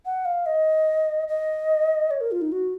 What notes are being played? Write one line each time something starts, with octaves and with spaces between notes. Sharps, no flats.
F#5
F5
D#5
D#5
C#5
A#4
F4
D#4
F#4